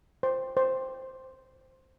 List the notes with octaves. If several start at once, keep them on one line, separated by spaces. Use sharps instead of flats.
C5
C5